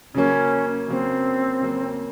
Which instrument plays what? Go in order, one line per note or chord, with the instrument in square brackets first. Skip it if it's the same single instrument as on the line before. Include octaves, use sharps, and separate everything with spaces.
[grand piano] C#3 F#3 A#3 [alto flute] C#4
[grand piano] C#3 F#3 A#3 [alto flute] C4
[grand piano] C#3 F#3 A#3